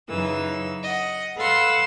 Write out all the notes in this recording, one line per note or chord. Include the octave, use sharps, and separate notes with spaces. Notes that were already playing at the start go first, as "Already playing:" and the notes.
F#2 C#3 E3 D#4 E6
D#5 F#5
A4 B4 F5 F#5 C6 E6